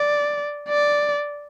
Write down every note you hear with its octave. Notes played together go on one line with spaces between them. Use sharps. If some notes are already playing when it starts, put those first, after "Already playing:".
Already playing: D5
D5